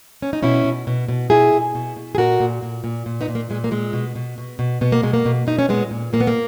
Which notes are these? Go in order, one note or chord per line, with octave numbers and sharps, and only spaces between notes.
C#4
D#4
B2 C#4 E4
B2
B2
B2
B2 E4 G#4
B2
B2
B2
G#4
A#2 F#4 A#4
A#2
A#2
A#2
A#2
B3 D#4
A#2
A#3
A#2 G#3
A#3
A#2 G#3
B2
B2
B2
B2
B2 B3
A#3
B2 G#3
A#3
B2
B2 D#4
C#4
A#2 G#3 B3
A#2
A#2 A#3
B3
A#3